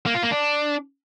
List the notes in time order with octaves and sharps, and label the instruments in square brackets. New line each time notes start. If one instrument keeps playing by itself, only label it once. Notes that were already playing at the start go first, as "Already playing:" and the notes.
[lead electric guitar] A#3
F4
A#3
D4